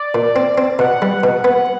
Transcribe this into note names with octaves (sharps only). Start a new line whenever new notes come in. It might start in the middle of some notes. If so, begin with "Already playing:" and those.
Already playing: D5
A#2
C4
C4
B2 F#5
G3
B2
B3